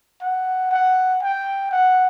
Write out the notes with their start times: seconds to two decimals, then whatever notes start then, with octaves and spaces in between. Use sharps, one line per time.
0.22 F#5
0.71 F#5
1.22 G5
1.72 F#5